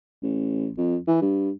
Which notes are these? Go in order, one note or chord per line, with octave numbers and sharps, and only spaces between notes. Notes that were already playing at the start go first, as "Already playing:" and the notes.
A1
F2
E3
G2